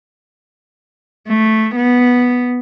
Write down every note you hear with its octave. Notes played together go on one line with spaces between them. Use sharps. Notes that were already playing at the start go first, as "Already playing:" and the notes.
A3
B3